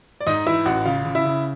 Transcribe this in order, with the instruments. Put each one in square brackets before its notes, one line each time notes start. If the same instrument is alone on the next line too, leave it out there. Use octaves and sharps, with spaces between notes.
[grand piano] D5
G#2 D#4 D#5
E3 E4 E5
A1 F#4 F#5
C#3 F4 F5
C#3
E4 E5
C#3